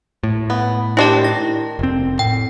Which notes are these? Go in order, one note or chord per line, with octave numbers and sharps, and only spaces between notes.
A2
B3
D#3 D4 E4 G4 D5
A#6
F1 C4
A2 G5